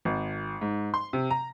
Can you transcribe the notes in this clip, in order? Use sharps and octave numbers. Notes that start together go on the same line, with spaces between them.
G#1
G#2
C6
C3
A#5